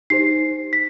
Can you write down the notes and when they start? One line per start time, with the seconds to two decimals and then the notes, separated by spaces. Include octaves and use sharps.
0.10 D#4 G4 C5 C7
0.73 B6